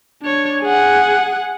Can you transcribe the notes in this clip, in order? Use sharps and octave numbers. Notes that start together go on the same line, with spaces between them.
D4 C#5
G#4 F#5